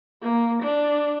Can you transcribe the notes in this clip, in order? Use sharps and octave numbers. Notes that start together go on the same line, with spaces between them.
A#3
D4